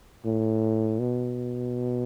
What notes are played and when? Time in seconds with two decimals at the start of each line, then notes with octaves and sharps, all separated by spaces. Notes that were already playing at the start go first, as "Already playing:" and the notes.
0.25 A2
0.99 B2